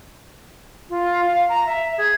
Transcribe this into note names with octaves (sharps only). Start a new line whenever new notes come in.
F4
F5
A#5
E5
G#4